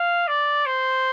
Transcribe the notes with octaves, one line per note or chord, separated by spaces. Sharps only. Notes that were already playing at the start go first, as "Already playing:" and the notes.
Already playing: F5
D5
C5